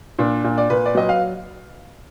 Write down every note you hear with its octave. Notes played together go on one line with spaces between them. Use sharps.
A#2 D4
A#2
D5
A#2 B4
D5
F#3 D#5
F5